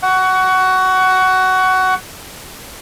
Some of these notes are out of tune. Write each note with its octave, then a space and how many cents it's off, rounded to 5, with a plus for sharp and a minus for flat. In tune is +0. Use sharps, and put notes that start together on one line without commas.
F#5 +15 C#6 +20